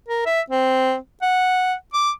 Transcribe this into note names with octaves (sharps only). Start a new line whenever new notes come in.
A#4
E5
C4
F#5
D6